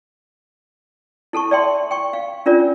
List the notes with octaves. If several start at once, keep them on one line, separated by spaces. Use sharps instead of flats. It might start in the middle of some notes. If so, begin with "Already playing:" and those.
E4 A4 A5 C#6
D5 E5 G5 C6
G5 C#6
F5
C#4 D4 F4 A#4 D5